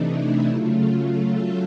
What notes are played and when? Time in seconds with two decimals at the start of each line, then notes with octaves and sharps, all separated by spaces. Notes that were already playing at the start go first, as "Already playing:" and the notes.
Already playing: C3 E3 A3 D4 D#4
0.10 E4
0.48 C#3 F#3 A3 F4
1.22 A4